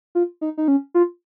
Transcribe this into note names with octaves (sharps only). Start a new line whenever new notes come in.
F4
D#4
D#4
C#4
F4